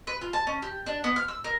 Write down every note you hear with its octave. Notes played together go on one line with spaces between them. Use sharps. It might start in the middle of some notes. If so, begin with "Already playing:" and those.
B4
F4
A5
C#4
G4
D4
B3
F6
E6
A#4